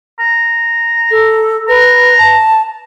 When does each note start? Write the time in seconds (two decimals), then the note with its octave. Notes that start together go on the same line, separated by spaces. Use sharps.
0.20 A#5
1.11 A4
1.68 B4 A#5
2.18 A5